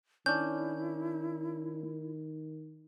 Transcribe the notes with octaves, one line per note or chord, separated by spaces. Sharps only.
D#3 C#4 D4 E4 G6